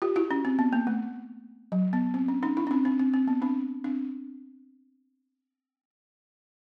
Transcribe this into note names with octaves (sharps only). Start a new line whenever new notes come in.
F4 G4
E4 F#4
C#4
C4
B3
A#3
A3
F#3
B3
C4
C#4
C#4 D#4
D4 E4
C#4
C4 D4
C4 D4
C4
C4
B3
C4 D4
C4 D4